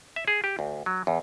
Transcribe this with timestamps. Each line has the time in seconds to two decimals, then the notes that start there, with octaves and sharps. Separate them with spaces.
0.16 E5
0.28 G#4
0.44 G4
0.59 D2
0.86 F#3
1.07 E2